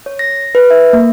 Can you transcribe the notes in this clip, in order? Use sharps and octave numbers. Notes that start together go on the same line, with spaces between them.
C#5
A#6
B4
E5
A#3